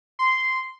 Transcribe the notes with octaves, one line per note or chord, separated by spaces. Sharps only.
C6